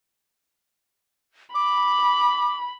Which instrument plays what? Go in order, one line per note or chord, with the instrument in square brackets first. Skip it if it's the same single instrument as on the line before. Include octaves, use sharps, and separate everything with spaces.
[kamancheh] B5 [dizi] D6